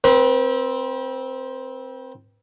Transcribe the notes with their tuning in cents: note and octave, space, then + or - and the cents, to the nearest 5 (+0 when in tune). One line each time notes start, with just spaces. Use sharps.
C4 +0 B4 -40